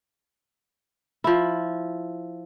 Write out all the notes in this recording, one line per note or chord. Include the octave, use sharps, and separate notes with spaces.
F3 E4